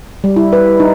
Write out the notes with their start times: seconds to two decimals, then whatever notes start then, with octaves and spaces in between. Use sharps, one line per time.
0.24 G3
0.36 E4
0.53 B4
0.80 D#4